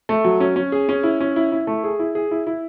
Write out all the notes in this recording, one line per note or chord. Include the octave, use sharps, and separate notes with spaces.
A3
F#3
C#4
C#4
G#4
C#4
E4
C#4
E4
E4
A3
G#4
E4
G#4
E4
E4